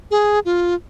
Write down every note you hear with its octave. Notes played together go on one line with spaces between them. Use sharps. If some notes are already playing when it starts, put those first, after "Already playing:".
G#4
F4